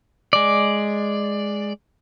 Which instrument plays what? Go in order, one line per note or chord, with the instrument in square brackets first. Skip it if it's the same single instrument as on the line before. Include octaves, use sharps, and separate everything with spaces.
[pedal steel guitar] G#3 D5